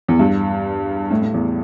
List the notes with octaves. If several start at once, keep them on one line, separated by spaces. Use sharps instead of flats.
E2
G2
A2
A2
E2